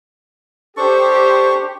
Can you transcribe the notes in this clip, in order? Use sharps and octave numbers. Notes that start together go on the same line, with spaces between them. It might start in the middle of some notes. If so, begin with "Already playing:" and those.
D4 G4 A4 C5 C#6